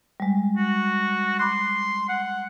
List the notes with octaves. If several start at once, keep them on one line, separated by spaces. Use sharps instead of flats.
G3 G#3
F#4
B5 C6 D6 F#6
F#5